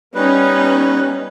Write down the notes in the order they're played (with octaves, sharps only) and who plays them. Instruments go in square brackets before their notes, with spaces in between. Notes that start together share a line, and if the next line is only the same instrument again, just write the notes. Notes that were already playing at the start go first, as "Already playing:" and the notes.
[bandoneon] G3 B4 [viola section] B3 C#4 D#4